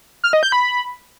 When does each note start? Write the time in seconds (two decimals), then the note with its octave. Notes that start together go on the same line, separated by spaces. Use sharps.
0.24 F6
0.33 D#5
0.43 G6
0.52 B5